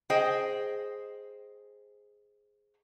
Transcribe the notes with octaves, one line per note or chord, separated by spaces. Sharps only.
G#4 C5 D#5 G5